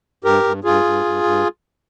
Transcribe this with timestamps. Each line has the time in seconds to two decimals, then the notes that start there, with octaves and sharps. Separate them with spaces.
0.24 G2 G4 A#4
0.44 G2
0.64 G2 F4 G#4
0.84 G2
1.05 G2
1.24 G2